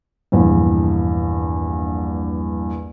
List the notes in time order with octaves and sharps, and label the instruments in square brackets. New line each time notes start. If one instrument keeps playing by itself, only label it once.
[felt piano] A#1 E2 G2